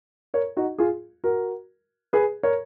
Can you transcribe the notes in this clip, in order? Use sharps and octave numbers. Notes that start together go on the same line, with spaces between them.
A#4 C#5
D#4 F#4
F4 G#4
F#4 A#4
G#4 B4
A#4 C#5